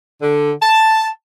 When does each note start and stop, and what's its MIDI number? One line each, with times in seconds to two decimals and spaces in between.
0.22 0.52 50
0.61 1.07 81